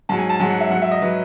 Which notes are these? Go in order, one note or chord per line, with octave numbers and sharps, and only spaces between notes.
G#2 F#3 A5
G#5
A5
G#2 F#3 G#5
F#5
E5
G#2 F#3 F#5
E5
D#5
F#3 B4